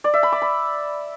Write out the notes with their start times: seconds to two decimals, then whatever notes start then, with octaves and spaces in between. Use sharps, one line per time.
0.04 D5
0.14 E5
0.23 B5
0.32 D6
0.42 B5